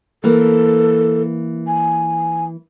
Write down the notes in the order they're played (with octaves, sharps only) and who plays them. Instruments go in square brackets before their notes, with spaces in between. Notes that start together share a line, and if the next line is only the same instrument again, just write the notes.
[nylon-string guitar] E3 A#3 [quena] A4
[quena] G#5